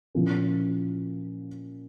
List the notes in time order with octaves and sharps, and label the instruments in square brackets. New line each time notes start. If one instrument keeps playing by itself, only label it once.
[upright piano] A#2 F3 A#3 C#4 E4